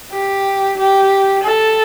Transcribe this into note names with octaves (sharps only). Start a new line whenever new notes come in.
G4
G4
A4